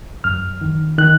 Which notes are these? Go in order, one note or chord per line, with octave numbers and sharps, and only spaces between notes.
F#2 F6
D#3
D#3 F#6